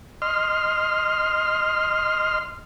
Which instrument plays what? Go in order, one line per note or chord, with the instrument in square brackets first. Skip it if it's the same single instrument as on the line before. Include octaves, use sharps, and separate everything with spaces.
[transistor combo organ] D#5 C6 F6